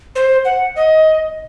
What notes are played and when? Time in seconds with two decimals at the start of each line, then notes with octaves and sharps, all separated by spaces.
0.15 C5
0.45 F#5
0.76 D#5